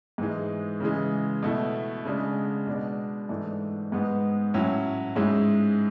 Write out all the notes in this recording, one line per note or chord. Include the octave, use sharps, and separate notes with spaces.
G#2 E3 G#3
C#3 E3 G#3
B2 A3 E4
C#3 G#3 D4
B2 G#3 D4
G#2 E3 A3 D4
G#2 G#3 B3
A2 F#3 C#4 E4
G#2 G#3 C#4 E4